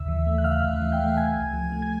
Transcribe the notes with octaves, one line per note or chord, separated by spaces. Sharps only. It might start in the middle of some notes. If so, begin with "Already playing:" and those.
Already playing: D#2 C#3 E5 E6
E3
A3
F#6
C#3 F5 F6
D#2
E3
G5 G6
A3
C3 G#5 G#6
C#2
F3
A3
G#6